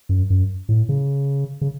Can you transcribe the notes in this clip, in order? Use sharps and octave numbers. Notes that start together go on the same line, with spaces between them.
F#2
F#2
A2
C#3
C#3